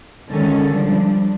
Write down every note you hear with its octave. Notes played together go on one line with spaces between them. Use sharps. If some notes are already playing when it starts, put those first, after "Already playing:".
D3 D#3 G#3 C#4 A4
F3 G3 D4